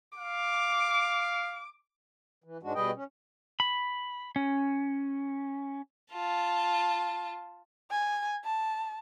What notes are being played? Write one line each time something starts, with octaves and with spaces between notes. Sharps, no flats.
F5 D6
E3
G#2 G#3 D4 F#4
B2 G3 G#4 B4 D#5 G5
C#4
B5
C#4
F4 A5
G#5
A5